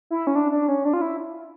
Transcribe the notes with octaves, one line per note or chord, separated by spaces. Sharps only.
E4
C#4
D4
D4
C#4
D4
F4
E4